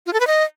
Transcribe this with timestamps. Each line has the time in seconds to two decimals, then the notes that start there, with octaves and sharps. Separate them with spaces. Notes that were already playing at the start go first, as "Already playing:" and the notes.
0.06 F4
0.13 A4
0.20 B4
0.27 D#5